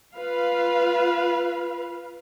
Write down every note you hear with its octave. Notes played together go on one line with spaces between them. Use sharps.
F4 B4 F5